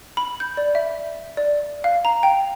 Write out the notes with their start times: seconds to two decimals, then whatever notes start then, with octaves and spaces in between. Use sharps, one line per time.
0.17 B5
0.40 G6
0.57 D5
0.75 E5
1.37 D5
1.84 F5
2.05 A#5
2.23 G5